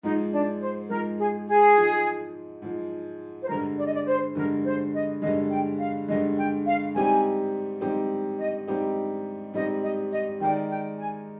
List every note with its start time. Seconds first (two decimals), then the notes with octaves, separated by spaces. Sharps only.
0.03 G#2 F3 G#3 D#4
0.32 D4
0.60 C5
0.89 G#2 F3 G#3 A#4
1.18 G#4
1.47 G#4
1.77 G#2 F3 G#3
2.62 G#2 F3 G#3
3.42 C5
3.49 G2 D3 G#3 A#4
3.78 D5
3.86 D#5
3.94 D5
4.07 C5
4.35 G2 D3 G#3 A#4
4.65 C5
4.94 D#5
5.22 G2 D3 G#3 D#5
5.51 G5
5.79 F5
6.08 G2 D3 G#3 D#5
6.37 G5
6.66 F5
6.95 G#2 G3 C4 D#4 G4 G#5
7.81 G#2 G3 C4 D#4 G4
8.39 D#5
8.68 G#2 G3 C4 D#4 G4
9.54 G#2 G3 C4 D#4 G4 D#5
9.83 D#5
10.12 D#5
10.40 D#3 G#3 D#4 A#4 D5 G5
10.69 G5
10.98 G#5